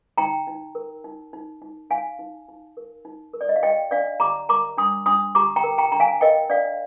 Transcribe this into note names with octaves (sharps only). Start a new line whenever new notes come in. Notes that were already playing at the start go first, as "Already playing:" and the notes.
D#4 G5 A#5
D#4
A#4
D#4
D#4
D#4
D#4 F5 G#5
D#4
D#4
A#4
D#4
A#4
D5
D#5
F5
G4 D#5 G5
D4 D5 F5
G4 A#5 D6
A#4 A#5 D6
D4 C6 D#6
D4 C6 D#6
G4 A#5 D6
G5 A#5
A#4
G5 A#5
D4 A#5
F5 G#5
A#4 D#5 G5
D4 D5 F5